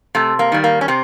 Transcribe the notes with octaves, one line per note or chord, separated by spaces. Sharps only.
C3 A3
A#3
D#3 G3
A#3
C#4
C3 C4